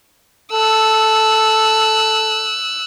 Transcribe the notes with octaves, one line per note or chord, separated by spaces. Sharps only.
A4 E6 F#6